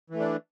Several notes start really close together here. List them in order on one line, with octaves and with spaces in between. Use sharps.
E3 A3 D4